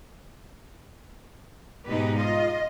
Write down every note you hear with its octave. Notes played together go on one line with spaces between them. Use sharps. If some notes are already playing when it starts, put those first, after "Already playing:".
G#2 B2 G#3 D#4 G4 B4
F4 D#5